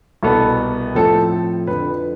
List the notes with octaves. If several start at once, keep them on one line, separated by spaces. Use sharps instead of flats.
C2 B2 B3 A4
A2 F3 C4 A4
F2 D3 F3 B4